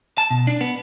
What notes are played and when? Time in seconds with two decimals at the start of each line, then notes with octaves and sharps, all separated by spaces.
0.18 A5
0.31 B2
0.47 D4
0.61 B3